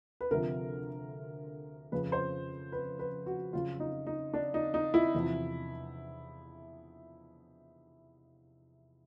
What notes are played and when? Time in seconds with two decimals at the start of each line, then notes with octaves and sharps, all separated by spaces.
0.21 B4
0.31 D2 C3 F3 A#4
1.92 F2 C#3 F3 B4
2.12 C5
2.72 B4
2.99 B4
3.26 F#4
3.53 F2 C#3 F#3 F4
3.80 D#4
4.07 D#4
4.34 D4
4.54 D#4
4.74 D#4
4.94 E4
5.14 E2 C3 F3